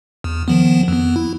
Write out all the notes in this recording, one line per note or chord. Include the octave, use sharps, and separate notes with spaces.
E2
D#3 F3 B3
F2 B3
E4